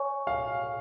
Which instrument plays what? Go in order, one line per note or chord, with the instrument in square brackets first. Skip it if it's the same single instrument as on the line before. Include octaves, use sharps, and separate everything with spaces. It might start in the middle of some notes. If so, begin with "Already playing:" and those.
Already playing: [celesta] C#5 G#5 C#6
[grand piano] F5